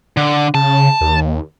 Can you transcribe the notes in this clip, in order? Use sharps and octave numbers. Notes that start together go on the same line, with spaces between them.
D3
C#3 A5
D#2